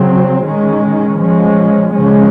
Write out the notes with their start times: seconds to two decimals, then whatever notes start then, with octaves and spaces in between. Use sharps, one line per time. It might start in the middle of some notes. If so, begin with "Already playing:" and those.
Already playing: C#3 F#3 C4
0.44 D#3 G#3 C#4
1.19 F3 G#3 C#4
1.94 C#3 F3 G#3 C#4